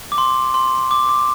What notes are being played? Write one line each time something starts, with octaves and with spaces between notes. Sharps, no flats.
D6
C6
C6
D6
D6